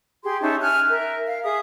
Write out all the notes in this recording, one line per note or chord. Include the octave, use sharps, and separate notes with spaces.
G4 G#4 C6
C#4 D#4 E5 A5
G#5 F6 F#6
A#4 E5
F5
G#4 E5 D#6